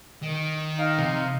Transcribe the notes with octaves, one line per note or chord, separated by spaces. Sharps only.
D#3
D#4 F5
C3